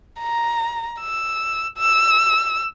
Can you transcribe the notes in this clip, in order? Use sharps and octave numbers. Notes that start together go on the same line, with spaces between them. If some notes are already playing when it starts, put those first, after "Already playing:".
A#5
E6
E6